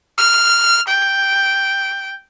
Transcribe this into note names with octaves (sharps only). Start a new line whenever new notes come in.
F6
G5